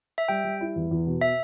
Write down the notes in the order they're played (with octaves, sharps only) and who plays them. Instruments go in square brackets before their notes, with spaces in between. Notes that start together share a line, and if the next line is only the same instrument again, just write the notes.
[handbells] E5
[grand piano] G3 [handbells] G5
[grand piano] G3
E4
E2
E2
B2
[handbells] E5